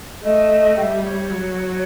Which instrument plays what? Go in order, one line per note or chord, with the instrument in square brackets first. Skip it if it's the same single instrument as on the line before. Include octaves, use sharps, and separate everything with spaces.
[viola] A3 [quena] D#5
[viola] G3 [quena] E5 G5
[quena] C#5
[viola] F#3